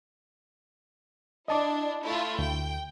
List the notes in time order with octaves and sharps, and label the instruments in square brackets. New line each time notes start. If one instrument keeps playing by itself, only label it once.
[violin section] D4 E4 [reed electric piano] D#5 A5 D6
[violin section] A3 E4 F4
[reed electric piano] D2 [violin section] G5